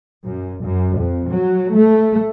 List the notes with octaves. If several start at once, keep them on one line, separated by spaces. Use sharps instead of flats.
F#2
F#2
F2
F#3
A3